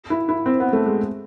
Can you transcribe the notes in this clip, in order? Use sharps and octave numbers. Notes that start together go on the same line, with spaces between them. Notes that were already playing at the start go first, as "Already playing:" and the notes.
E4
E4
C4
B3
A3
G#3